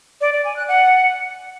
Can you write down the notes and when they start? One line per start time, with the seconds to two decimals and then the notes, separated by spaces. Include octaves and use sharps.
0.21 D5
0.33 D5
0.45 G#5
0.56 F#6
0.68 F#5